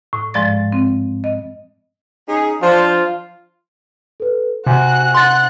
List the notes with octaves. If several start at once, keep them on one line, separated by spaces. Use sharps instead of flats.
A2
G#2 F3 G#3 D5 A6
C4
D#5
C#4 D#4 G#4
F3 D4 F4 C5
A4 B4
C3 F#4 G#5 F#6
F#5 C6 F#6 A6